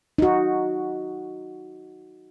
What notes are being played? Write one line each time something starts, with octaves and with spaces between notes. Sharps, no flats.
D#4 F#4